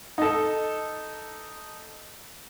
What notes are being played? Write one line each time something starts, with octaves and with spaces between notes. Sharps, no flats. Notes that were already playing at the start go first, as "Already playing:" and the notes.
D#4 A4